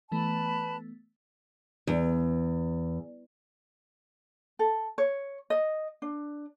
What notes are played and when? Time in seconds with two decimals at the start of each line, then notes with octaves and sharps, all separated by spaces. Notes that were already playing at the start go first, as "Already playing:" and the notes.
0.12 E3 A3 B3 B4 A5 B5
1.87 E2
4.59 A4
4.98 C#5
5.50 D#5
6.02 D4